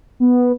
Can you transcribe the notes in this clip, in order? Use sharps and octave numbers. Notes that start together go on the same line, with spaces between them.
B3